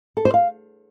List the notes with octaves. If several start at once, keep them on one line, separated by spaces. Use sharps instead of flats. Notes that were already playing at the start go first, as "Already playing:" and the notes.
A4
C5
F5